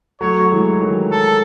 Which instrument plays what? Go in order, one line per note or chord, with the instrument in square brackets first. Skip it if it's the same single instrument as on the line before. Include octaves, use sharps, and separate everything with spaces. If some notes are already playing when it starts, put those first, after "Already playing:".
[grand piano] F#3 A3 [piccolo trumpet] C#5
[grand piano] F#3
E3 G#3
D#3 F#3
[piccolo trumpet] A4